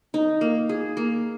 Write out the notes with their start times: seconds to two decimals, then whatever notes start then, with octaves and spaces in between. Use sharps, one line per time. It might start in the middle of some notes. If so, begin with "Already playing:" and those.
0.14 D#4
0.41 A#3
0.69 G#4
0.97 A#3